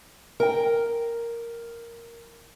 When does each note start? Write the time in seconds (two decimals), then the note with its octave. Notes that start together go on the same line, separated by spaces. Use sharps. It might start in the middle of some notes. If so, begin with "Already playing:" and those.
0.40 A#4 G5